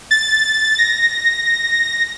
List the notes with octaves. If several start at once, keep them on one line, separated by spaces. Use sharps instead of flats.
A6
A#6